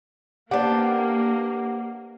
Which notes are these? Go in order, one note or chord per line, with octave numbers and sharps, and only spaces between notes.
A#3 D4 G4 B4 C5 F#5